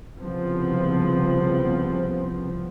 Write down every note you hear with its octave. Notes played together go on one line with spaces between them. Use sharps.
C2 C#3 F3 B3 C4